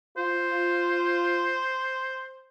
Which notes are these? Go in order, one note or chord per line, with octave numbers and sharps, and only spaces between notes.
F4 C5